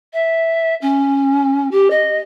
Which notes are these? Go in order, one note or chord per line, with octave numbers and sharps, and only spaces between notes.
E5
C#4
G4
D#5